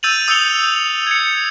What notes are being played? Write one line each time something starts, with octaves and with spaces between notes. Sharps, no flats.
E6 G6 A6 D#7 F7 F#7
D#6 E6 G6 C#7 F7 G7
G#6 C#7